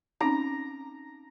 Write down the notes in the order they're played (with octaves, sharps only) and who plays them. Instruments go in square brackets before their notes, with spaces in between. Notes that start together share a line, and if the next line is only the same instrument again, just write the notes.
[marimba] C4 C#4 D#4 [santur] A#5